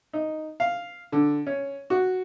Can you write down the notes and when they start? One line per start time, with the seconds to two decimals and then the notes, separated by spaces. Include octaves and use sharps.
0.13 D#4
0.60 F5
1.12 D3
1.47 C#4
1.90 F#4